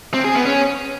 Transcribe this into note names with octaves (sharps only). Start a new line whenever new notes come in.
C4
G#4
B3
C#4